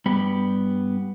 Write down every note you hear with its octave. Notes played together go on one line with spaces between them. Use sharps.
G2 G3 B3 G4 B5